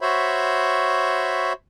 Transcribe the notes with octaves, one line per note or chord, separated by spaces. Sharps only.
F#4 C5 C#5 E5 B5